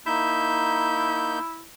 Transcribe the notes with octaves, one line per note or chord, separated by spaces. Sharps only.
A#3 D#4 E4 G6